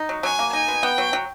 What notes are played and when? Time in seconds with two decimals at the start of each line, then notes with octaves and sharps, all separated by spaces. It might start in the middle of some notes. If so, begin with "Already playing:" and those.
Already playing: D#4
0.09 F#3
0.23 F#3 G#5
0.39 A#3
0.53 D#4 G#5
0.68 B2
0.83 B3 G5
0.98 F#3
1.13 F#3